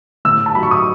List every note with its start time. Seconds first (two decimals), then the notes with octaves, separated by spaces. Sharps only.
0.25 A2 E6
0.46 A5
0.55 F#3 B5
0.63 C#6
0.71 D#6